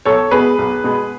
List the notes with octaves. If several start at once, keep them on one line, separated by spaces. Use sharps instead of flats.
B1 A4 C#5
B2 G#3 B3 G#4 B4
B1
B2 G#3 B3